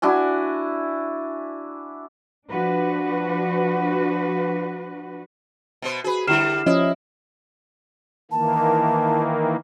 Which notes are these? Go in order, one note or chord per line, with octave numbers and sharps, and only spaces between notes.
D4 E4 F#4 G#5
F3 D4 F#4 B4
B2 B3 C5
F#4 G#4 B4
D3 G3 E4 G4 F6 C7 E7
F3 C#4 E4 D#5
D#3 E3 A#3 A5